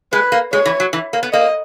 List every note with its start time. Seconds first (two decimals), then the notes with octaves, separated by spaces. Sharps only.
0.13 G#3 B4
0.32 A#3
0.53 G#3 C#5
0.66 E3
0.80 F#3
0.93 E3
1.13 A#3
1.23 B3
1.33 A#3 D#5